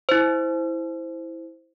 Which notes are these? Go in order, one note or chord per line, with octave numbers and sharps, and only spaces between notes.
E4 C5